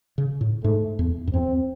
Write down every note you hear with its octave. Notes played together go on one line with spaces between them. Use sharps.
C#3
A2
G#2 A3
E2
F#2
E2 C4